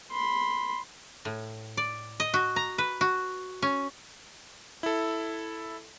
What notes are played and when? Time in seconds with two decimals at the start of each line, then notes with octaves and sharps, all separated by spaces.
0.11 B5 C6
1.25 A2
1.77 D5
2.20 D#5
2.34 F#4
2.56 A#5
2.78 B4
3.01 F#4
3.62 C#4
4.83 E4 A4